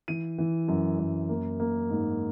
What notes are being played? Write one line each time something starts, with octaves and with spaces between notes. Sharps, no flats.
E3 D#7
E3
F#2
F#2
A#3
A#3
G#2